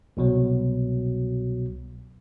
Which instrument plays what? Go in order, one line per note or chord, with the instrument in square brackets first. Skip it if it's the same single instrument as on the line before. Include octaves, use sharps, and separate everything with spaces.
[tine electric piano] C2 B2 F#3